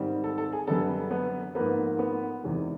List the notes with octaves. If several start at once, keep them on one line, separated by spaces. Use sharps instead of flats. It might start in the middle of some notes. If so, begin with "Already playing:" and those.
Already playing: G#2 D#3 G3 C4
A4
A4
G#4
F#2 D3 G3 B3 A4
B3 B4
G#2 F3 A#3 B3 B4
B3 B4
E2 C3 D#3 G#3